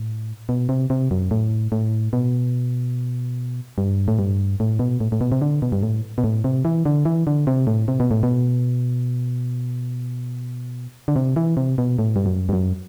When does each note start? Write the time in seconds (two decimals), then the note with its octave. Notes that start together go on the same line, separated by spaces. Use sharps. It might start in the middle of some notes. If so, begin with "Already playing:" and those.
Already playing: A2
0.49 B2
0.69 C3
0.90 C3
1.11 F#2
1.31 A2
1.72 A2
2.13 B2
3.78 G2
4.08 A2
4.19 G2
4.60 A2
4.79 B2
5.00 A2
5.12 A2
5.21 B2
5.32 C3
5.42 D3
5.62 B2
5.72 G2
5.83 A2
6.18 B2
6.24 A2
6.44 C3
6.65 E3
6.85 D3
7.05 E3
7.27 D3
7.47 C3
7.67 A2
7.88 C3
8.00 B2
8.11 A2
8.23 B2
11.08 D3
11.16 C3
11.36 E3
11.57 C3
11.78 B2
11.99 A2
12.16 G2
12.26 F#2
12.49 G2
12.53 F#2